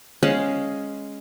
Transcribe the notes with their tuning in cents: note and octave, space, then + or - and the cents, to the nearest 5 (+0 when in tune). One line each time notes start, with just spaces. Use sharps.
G#3 +0 C#4 +0 F5 +0